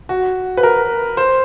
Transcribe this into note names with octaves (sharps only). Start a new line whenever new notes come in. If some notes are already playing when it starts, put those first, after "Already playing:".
F#4
B4
A#4
C5